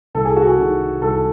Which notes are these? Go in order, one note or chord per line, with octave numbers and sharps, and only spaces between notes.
C2 A4
G#4
F#4
G#4
C3 D#3
C2 A4